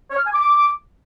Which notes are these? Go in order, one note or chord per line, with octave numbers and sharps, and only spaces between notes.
C#5
F6
G#5
D6